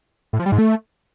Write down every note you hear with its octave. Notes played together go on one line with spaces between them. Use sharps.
A2
F3
G3
G#2
A3